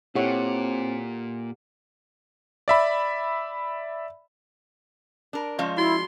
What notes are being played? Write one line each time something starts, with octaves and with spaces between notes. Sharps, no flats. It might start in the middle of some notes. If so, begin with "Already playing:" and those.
A#2 C4 E4 G4 A4 C#5 F#5
D5 E5 B5
D4 A#4
F3 G#3 C#4 D5 F5
E4 F#4 C6 G7